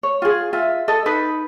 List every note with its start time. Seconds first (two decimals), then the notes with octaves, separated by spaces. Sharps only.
0.03 C#5
0.22 F4 G#4
0.53 F4 E5
0.88 A4 D#5
1.06 D#4 B4